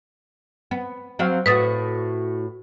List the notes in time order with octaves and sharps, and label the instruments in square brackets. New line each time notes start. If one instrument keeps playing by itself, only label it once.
[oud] B3
F#3 C4 F5
[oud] A2 F#4 [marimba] B4 D#6 A6